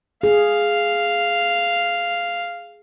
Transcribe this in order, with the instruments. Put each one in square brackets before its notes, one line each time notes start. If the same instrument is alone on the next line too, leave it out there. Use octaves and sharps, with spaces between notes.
[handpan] G#4 [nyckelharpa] F5